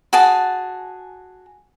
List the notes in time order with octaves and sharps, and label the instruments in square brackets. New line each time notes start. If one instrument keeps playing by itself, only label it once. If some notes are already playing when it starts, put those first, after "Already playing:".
[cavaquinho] F#4 G#4 A5